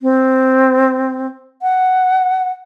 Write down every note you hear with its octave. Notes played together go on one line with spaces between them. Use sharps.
C4
F#5